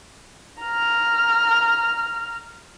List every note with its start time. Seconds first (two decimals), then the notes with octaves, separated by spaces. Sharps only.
0.62 A#5 F6